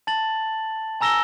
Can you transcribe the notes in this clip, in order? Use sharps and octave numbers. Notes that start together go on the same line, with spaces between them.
A5 A6 F#7
G#5 A#5 E6 A#6 E7 G7